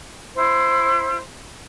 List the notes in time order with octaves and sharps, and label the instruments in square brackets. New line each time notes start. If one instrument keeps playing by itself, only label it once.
[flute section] E4 C5